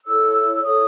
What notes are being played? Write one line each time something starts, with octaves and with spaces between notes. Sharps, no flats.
E4 A4 C#5 E6
E6
E4 A4 C#5 D#6